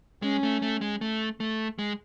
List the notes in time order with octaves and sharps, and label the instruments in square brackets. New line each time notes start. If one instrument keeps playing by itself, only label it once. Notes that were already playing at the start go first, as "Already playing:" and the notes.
[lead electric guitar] G#3 [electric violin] C#4
[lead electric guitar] A3
A3
G#3
A3
A3
G#3